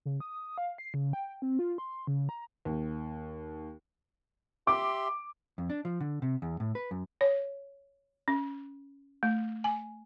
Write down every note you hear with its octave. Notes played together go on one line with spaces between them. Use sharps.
C#3
D#6
F5
C7
C#3
G5
C4
F4
C6
C#3
A#5
D#2
G4 E5 C6 D6
F2
D4
F3
D3
C3
E2
A2
B4
F#2
C#5
C#4
A3
G#5